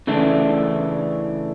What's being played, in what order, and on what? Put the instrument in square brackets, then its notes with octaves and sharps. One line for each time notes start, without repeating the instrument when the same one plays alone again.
[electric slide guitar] C#3 E3 A3 D4